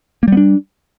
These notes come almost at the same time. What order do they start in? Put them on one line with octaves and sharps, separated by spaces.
A#3 G3 B3 D4